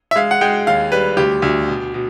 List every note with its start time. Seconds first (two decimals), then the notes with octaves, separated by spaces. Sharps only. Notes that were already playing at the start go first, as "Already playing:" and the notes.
0.11 E5
0.16 G#3 F5
0.31 F#5
0.41 G#3 G5
0.67 D#2 F5
0.92 G3 B4
1.17 D2 G4
1.42 D2
1.68 B2
1.94 B2